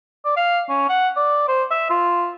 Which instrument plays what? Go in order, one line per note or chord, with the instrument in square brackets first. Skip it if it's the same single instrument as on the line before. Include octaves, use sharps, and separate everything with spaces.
[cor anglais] D5
F5
C#4
F#5
D5
C5
E5
F4